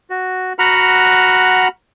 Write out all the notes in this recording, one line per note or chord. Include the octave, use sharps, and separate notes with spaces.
F#4
F#4 F#5 A#5 B5 F6